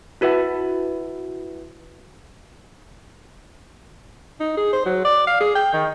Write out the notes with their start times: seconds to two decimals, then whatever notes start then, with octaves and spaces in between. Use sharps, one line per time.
0.21 E4 F#4 B4 E5 F#5
4.40 D#4
4.57 G#4
4.73 C5
4.86 F#3
5.05 D5
5.27 F5
5.40 G#4
5.55 G5
5.73 D#3